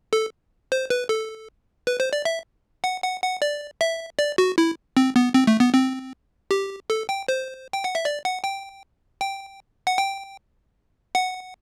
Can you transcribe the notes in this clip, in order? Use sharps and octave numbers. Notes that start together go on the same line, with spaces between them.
A4
C5
B4
A4
B4
C5
D5
E5
F#5
F#5
F#5
D5
E5
D5
F#4
E4
C4
B3
C4
A3
B3
C4
G4
A4
G5
C5
G5
F#5
E5
D5
F#5
G5
G5
F#5
G5
F#5